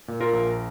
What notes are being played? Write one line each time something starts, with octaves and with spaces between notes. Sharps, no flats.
A#2
F4 A#4
A#1